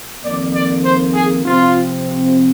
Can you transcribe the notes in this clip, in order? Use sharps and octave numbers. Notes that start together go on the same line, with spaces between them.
F2 D#3 A#3 D5
D5
C5
G#4
C3 F3 C4 F4